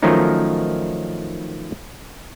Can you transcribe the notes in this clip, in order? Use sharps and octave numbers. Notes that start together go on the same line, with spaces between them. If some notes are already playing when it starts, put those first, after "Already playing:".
D#3 F3 F#3 A3 C#4 D#4